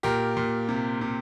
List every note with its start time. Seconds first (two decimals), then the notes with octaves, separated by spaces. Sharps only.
0.03 A#2 G4 A#4
0.37 A#2
0.69 C3
1.01 C3